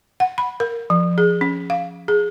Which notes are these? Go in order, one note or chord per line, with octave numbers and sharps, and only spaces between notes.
F#5
B5
A#4
F3
G#4
C#4
F5
G#4